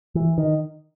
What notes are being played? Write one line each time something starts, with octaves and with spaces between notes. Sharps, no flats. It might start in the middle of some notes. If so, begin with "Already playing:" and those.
E3
D#3